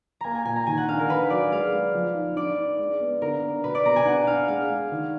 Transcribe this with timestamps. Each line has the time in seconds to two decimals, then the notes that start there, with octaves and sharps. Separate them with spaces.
0.21 A#3 G#5 A#5
0.35 G#5
0.45 A#2 G#5
0.56 A#5
0.67 D#3 G#5
0.78 F#5
0.88 D4 F5
0.99 A#4
1.09 D#4 B4
1.30 F#3 D5
1.52 G#3 F5
1.73 G#3
1.94 F3
2.15 D#4
2.36 D4 D5
2.58 D4
2.79 G#3
3.00 B3
3.22 D3 A#4
3.43 B3
3.64 B2 B4
3.75 D5
3.86 B2 A#5
3.96 G#5
4.06 D4 F#5
4.27 D4 F5
4.48 G#3 F5
4.70 G#3
4.92 D#3